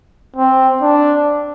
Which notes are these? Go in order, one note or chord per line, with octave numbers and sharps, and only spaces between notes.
C4
D4